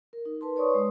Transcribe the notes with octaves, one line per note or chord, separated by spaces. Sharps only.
A#4
D#4
B4 A5 C6
B4 C#5 D5 C6 C#6 D#6
G#3 D#6